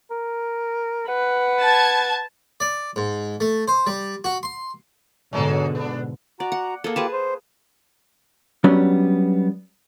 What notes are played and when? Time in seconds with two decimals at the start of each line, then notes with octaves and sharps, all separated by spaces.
0.11 A#4
1.08 B4 F#5
1.61 A5 G#6
2.60 D5
2.96 G#2
3.40 A3
3.68 C5
3.87 G3
4.24 F#4
4.43 C6
5.33 G#2 B2 D3 F#3 G#3 A4
5.75 B3 D4
6.40 F#4 D5 A#5
6.52 F#5
6.84 A#3 G#4 A4
6.96 F4 G4 G#4 B4 A5 D6
7.13 C5
8.64 F#3 G3 B3 C#4 D4